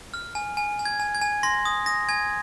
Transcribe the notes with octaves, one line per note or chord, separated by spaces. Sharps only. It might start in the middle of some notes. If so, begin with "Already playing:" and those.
F6
G#5
G#5
G#5
G#6
G#5
G#6
G#5
C6 A#6
D#6
D#6 A#6
G#5 G#6